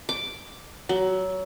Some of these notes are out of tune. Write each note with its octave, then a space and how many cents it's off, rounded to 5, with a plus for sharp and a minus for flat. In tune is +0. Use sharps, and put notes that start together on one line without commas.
D6 -5
F#3 +20